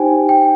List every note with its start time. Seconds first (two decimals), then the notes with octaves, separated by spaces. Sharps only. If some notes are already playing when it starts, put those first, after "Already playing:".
Already playing: D#4 G4 C5 G5 G#5
0.29 G5